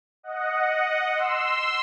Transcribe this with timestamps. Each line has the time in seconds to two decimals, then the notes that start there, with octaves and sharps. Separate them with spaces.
0.23 D#5 F#5
1.15 C6 E6